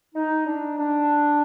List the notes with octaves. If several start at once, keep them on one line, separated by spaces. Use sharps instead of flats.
D#4
D4
D4